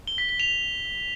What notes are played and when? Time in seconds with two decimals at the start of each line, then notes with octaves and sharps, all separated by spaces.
0.07 G7
0.18 B6
0.29 B6
0.40 F7